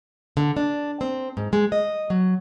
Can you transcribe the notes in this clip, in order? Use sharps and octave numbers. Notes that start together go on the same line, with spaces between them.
D3
D4
C4
G#2
G#3
D#5
F#3